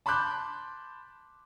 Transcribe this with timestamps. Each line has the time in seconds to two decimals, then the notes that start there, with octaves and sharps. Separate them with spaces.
0.06 A5 B5 C6 D6 F#6 G6